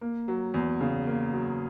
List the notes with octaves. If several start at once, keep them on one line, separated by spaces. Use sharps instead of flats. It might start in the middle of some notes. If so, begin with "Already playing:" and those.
A#3
F#3
E2
C#3
A#3
F#3